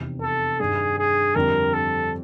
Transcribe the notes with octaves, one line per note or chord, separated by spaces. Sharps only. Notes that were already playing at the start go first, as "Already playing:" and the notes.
Already playing: F1 E2 C3
A4
G2 D#3 G3 G#4
G#4
F2 D3 G3 A#4
A4